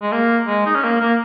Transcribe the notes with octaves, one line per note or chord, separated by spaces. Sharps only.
G#3
A#3
G#3
D#4
C#4
A#3
A#3